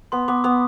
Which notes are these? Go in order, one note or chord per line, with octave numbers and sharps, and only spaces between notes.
B3 C6
B3 D6
B3 D#6